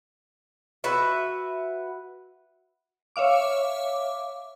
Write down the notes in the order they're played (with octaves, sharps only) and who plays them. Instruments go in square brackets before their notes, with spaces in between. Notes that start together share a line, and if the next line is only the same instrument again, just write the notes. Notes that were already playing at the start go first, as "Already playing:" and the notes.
[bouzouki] F#4 B4 E5
[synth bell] C#5 E5 F5 D6